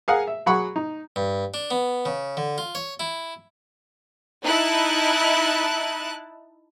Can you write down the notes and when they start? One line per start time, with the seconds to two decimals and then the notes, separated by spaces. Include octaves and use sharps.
0.08 G#4 A#4 F5 F#5 G#5 D#6
0.27 E5
0.46 F#3 G#4 F#5 B5 C#6
0.76 D#4
1.16 G2
1.54 D4
1.71 B3
2.05 C#3
2.37 D3
2.58 F4
2.75 C#5
3.00 E4
4.44 D#4 E4 A5 F#6